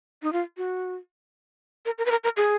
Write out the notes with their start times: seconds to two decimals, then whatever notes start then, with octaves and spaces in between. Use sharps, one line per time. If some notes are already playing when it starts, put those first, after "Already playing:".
0.22 D#4
0.33 F4
0.57 F#4
1.86 A#4
1.98 A#4
2.06 B4
2.11 A#4
2.24 A#4
2.37 G#4